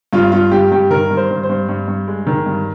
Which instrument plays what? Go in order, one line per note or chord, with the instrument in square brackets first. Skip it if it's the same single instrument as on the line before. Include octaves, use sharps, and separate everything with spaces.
[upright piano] G2 F4
G2 F4
G2 G4
G2 G4
D#3 A#4
G2
C5
G2
C5
G2
G2
G2
G#3
D#3
G2